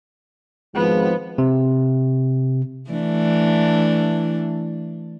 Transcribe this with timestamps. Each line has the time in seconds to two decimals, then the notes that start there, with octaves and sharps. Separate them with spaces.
0.75 G#1 G#2 F3 B3
1.38 C3
2.90 E3 A3 D4